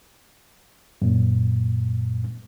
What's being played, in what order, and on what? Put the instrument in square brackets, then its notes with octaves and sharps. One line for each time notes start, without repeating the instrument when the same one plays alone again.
[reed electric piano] F#2 A#2